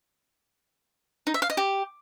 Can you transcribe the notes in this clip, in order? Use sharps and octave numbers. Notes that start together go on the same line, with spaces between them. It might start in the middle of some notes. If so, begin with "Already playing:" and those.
D#4
E5
F5
D#5
G4